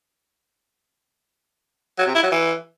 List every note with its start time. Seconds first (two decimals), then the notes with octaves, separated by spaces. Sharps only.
1.98 F#3
2.07 C3
2.15 E4
2.23 F#3
2.31 E3